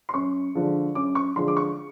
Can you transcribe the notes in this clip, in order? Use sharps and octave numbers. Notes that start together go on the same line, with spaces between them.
C6
F#2 C#6
D3 F3 G#3
F#2 D6
C#6
D3 F3 G#3 C6
D6
C#6